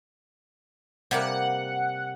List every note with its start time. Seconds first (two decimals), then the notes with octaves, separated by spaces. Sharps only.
1.11 C3 G3 A#3 F#5